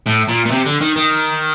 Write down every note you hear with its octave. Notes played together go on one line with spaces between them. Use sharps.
A2
A#2
A#2
C3
D3
D#3
D#3